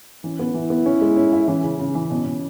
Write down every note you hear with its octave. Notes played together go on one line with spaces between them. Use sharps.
E3 C#4
B3
E3 E4
B3
C#4
G#3
C#4
E5
E3 C#4
C#3
C#3 C#4
E3
B2 C#4
B2